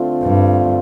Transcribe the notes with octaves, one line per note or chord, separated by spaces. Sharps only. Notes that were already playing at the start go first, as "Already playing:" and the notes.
Already playing: D3 A3 C4 F4
G2